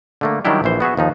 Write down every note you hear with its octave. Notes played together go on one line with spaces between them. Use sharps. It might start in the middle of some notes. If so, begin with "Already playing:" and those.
D3 A3 A#3
D#3 F#3 G3 D4 E4 G4
A#1 E3 C5
B3 F#4 G#4 E5
D#2 F3 D#4